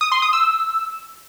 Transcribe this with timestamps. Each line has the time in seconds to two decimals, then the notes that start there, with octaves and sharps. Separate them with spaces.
0.01 D#6
0.12 C6
0.22 D#6
0.33 E6